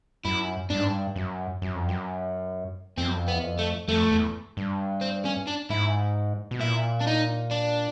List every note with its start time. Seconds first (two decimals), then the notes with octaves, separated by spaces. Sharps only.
0.25 F#2 E4
0.70 G2 D4
0.79 G#2
0.87 G2
1.16 F#2
1.62 F#2
1.75 F2
1.89 F#2
2.98 F2 C4
3.07 F#2
3.15 F2
3.28 B3
3.35 E2
3.43 F2
3.59 A3
3.88 F2 A3
4.11 E2
4.57 G2
5.01 C4
5.25 C#4
5.47 D4
5.70 G#2 E4
6.51 B2
6.61 A#2 E4
7.01 D4
7.07 D#4
7.51 D4